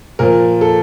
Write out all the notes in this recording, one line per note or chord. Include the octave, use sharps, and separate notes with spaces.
A#2 F3 A#4
A4